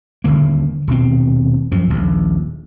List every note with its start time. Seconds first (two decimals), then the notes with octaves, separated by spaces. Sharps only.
0.24 D#1 E2 D3 A#3
0.88 D#1 B2 C4
1.72 F#2 F3
1.90 D#1 A#1